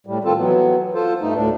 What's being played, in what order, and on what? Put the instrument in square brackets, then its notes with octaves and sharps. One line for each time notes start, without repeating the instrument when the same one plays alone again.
[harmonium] A2 G3
D#3 C4 F4 A4
E3 F#3 B3
F4 A4 C5
G2 A3 D#4
D2 A2 D4